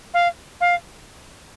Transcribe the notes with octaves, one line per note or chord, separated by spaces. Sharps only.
F5
F5